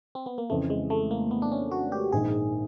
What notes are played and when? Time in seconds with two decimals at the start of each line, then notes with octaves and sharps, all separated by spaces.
0.15 C4
0.26 B3
0.38 A#3
0.50 F2 C#3 E3 A3
0.70 G#3
0.90 A3
1.11 A#3
1.31 B3
1.42 D4
1.52 C#4
1.71 F#4
1.92 G4
2.12 A#1 G#2 D#3 G#4